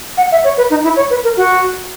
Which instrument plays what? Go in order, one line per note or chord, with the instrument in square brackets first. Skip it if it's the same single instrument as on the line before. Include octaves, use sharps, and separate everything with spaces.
[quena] F#5
E5
C#5
B4
D#4
E4
C#5
B4
A#4
F#4